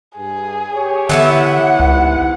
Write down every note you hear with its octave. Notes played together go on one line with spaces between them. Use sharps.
G2 G#4
G4 C#5
D3 E3 B3 E4 E5
F#5
C#2 G#2 C3